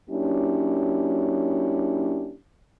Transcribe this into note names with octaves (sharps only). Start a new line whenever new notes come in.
F#3 A#3 C#4 D4 E4 G4